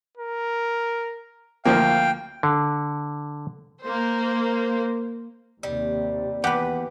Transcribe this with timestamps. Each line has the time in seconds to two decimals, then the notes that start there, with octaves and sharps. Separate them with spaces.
0.18 A#4
1.65 D2 F3 A#3 F5 G5
2.43 D3
3.85 A#3 C5
5.63 D#2 C3 G3
6.44 E2 G4 B4 F#5